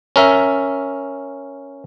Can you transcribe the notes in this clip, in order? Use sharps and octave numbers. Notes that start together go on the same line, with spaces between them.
C#4 A#4 E5